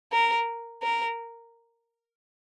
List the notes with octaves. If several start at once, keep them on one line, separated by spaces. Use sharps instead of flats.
A#4
A#4